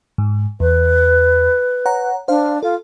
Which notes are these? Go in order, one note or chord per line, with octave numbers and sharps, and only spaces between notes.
G#2
E2 B4
C#5 F#5 A#5
D4 C5 F5
F4 A4